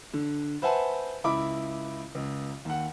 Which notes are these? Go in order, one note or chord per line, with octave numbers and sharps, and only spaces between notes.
D3
B4 C5 E5 F#5 G#5 A5
C#2 E4 B5 D6
C#2
D#2 F#5